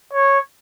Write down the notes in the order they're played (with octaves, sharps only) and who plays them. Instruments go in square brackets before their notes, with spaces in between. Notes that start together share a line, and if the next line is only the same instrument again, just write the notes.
[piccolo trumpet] C#5